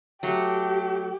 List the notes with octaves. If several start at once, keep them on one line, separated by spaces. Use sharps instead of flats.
F#3 A3 G4